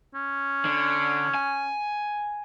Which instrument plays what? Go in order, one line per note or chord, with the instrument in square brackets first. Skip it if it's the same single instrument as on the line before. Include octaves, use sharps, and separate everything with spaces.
[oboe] C#4
[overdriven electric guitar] D3
G#5